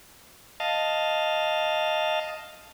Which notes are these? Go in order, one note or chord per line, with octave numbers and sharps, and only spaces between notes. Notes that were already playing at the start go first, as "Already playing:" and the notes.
D#5 F5 A5